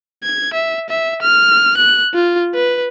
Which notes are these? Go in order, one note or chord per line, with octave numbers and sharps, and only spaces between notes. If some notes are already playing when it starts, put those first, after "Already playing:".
G#6
E5
E5
F6
F#6
F4
B4